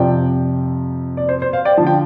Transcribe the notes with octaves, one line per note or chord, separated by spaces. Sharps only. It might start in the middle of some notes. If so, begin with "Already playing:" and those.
Already playing: F2 C3 F3 D5 G5
D5
C5
C5
C5 F5
D5 G5
D3 F3 A5
G5